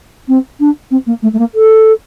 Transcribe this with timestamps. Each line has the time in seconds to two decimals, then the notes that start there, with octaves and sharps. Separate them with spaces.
0.28 C4
0.59 D4
0.90 C4
1.06 A#3
1.22 A3
1.33 A3
1.38 A#3
1.54 A4